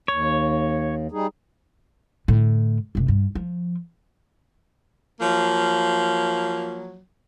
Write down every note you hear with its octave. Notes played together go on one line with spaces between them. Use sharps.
D#2 C#5
G3 D#4 G#4
A2 D3
F#1 C3
G2
F3
F3 F#3 A#3